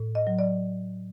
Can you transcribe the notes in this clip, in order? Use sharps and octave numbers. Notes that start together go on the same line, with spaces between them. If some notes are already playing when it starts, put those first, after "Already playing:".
Already playing: A2
D#5
F#3
D5